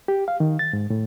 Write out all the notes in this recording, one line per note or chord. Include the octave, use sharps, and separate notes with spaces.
G4
F5
D#3
A6
G#2
A2